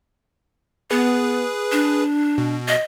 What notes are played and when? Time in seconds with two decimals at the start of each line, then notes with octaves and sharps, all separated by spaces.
0.91 B3 G#4 B4
1.72 D4
2.38 B2
2.68 D#5